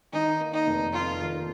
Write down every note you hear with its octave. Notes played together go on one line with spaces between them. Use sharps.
D#3 D#4
A#3
D#4
F1
F2 F4
D#3